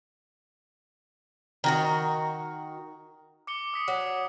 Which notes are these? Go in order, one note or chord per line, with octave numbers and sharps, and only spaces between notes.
D#3 F#4 A#5
D6 C#7 G7
D#6 B6 C#7
F#3